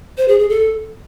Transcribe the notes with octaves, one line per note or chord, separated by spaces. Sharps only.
C5
G#4
G#4
A4